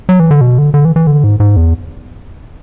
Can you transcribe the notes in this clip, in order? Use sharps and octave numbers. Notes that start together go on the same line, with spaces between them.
F#3
E3
D3
B2
D3
D3
E3
E3
D3
G#2
G#2
E2